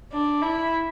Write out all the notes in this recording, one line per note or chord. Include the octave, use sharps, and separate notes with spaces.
D4
E4